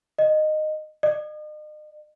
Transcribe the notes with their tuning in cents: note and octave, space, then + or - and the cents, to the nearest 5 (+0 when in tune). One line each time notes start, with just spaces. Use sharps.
D#5 -15
D#5 -40